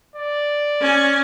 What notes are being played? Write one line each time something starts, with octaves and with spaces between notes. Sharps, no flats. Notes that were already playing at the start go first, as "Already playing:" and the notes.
D5
C#4 G#5